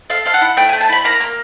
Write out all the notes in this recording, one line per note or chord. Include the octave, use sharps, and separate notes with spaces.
A4 F5
A4 F5
F#5
E4
A3 G5
G#5
A3
A5
E4 B5
A#3 A#5
A#3